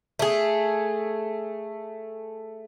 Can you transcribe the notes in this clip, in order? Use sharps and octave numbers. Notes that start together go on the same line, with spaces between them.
A3 G#4